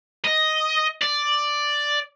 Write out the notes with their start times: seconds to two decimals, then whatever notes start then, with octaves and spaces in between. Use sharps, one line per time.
0.25 D#5
1.02 D5